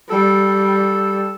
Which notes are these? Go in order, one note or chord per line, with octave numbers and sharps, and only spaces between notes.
G3 A4